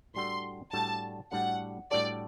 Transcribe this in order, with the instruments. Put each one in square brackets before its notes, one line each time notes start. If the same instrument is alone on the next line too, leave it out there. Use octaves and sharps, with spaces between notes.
[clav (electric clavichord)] A2 G3 D4 F#4 A4 [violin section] C6
[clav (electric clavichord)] A2 G3 D4 F#4 A4 [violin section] A5
[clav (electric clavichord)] A2 G3 D4 F#4 A4 [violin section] F#5
[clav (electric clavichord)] A2 G3 D4 F#4 A4 [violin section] D5